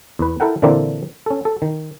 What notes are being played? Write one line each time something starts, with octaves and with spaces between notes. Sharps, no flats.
E2 B4
E4 A4 A#4 F#5 G5
A#2 D3 E3 A#3 C4 D4
C#4 A4
A4
D#3